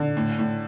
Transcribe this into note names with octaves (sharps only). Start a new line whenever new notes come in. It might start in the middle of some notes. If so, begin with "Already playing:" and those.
Already playing: D3
A2
A2